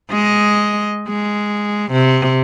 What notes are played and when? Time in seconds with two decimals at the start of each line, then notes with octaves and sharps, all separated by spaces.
0.10 G#3 D#5
1.08 G#3
1.92 C3